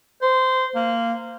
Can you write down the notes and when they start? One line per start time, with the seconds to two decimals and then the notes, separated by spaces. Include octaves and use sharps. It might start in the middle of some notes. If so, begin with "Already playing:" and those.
0.22 C5
0.75 A#3